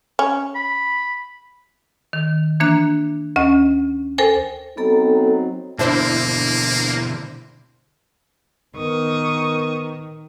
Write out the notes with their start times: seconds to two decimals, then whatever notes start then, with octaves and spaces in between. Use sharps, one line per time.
0.19 C#4
0.55 B5
2.13 D#3
2.60 E3 A#3 D4 F#6
3.36 D2 C#4 D#5
4.18 A4 A#4 C5 G5 G#5
4.77 F#3 B3 C4 D#4 A4 A#5
5.79 B2 D3 A#3 D4 E4 C5
8.76 D#3 B3 A#4 C#6 D#6